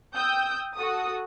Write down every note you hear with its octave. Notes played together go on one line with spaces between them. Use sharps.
G5 D#6 E6 G6
F#4 A4 D#6